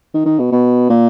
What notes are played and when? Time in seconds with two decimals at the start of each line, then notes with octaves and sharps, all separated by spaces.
0.14 D#3
0.26 D#3
0.39 B2
0.52 B2
0.89 A#2